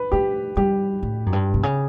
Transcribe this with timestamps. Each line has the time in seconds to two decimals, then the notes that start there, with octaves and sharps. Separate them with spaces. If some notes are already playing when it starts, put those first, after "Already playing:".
Already playing: B4
0.12 A3 G4
0.57 G3 G4
1.03 A2
1.26 F#2
1.33 G2
1.54 B2
1.63 C#3